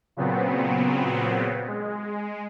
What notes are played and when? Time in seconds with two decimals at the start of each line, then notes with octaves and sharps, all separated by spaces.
0.17 A#2 C#3 F#3 B3 C4
1.68 G#3